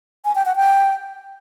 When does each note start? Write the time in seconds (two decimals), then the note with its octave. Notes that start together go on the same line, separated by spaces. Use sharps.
0.25 G#5
0.35 G5
0.46 F#5
0.56 G5